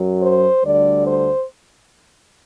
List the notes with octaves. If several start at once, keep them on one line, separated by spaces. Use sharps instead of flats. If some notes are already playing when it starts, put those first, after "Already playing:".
Already playing: F#2 F#3
C5
D2 D3 G3 D5
C5